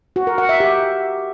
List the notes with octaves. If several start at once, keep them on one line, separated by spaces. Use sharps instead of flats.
F#4
A#4
F#5
E5
G4